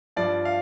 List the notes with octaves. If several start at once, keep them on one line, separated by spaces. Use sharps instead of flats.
G2 F3 D5
F5